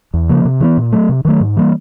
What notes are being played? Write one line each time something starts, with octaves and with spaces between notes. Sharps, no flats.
E2
C#3 F3 A#3
C3
E3 G#3 B3
A#2
F#3 A3
C3
D#3 F#3 A3
G#2
E3 G3 A#3